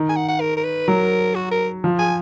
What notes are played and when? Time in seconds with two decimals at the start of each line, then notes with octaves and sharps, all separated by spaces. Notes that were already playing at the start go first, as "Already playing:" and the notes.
Already playing: D#3
0.09 G#5
0.16 F#5
0.29 F#5
0.40 A#4
0.57 A#4
0.64 B4
0.88 F#3 A#4
1.35 F#4
1.51 A#4
1.84 F3
1.99 G#5